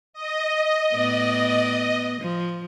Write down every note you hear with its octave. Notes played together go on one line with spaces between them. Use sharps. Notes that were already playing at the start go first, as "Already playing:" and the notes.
D#5
A2 B3 D5
F3